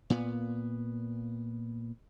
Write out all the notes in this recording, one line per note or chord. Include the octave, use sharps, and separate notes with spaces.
A#2 B3